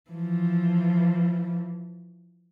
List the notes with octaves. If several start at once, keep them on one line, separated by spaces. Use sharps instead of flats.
E3 F3